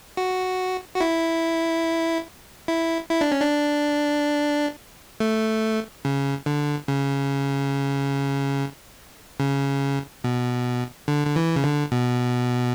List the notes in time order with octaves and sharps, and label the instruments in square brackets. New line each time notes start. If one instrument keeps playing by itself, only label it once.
[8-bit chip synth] F#4
F#4
E4
E4
E4
D4
C#4
D4
A3
C#3
D3
C#3
C#3
B2
D3
D3
E3
C#3
D3
B2